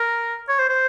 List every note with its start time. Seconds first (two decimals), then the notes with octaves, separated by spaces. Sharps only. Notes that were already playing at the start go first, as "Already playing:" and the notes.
Already playing: A#4
0.49 C#5
0.59 C5
0.69 C5